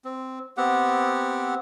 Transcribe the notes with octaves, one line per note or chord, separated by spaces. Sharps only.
C4
B3 C4 G4 F#5